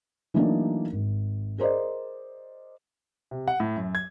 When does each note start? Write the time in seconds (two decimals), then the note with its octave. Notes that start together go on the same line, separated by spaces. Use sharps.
0.34 E3 F#3 A3 A#3 D4 D#4
0.92 G#1
1.58 G#4 A#4 C5 D5 D#5
3.31 C3
3.48 F#5
3.60 A2
3.77 F#2
3.95 G#6